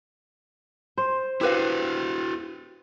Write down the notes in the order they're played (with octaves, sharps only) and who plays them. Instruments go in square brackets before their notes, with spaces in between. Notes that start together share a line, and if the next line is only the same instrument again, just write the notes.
[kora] C5
[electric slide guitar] E4 F#4 [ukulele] G4 B4 F5